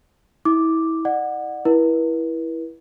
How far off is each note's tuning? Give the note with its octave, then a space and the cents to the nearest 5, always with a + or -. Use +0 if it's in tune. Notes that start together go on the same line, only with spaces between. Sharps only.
E4 -25 D6 +0
D5 +40 F#5 -10
E4 +0 B4 -45